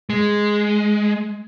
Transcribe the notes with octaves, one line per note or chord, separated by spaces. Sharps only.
G#3